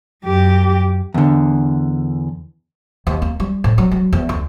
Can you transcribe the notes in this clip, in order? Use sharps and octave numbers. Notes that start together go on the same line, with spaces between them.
F#2 G4
E2 D3
D#2
A#3
G3
A2
F#3
F#3
E2
D2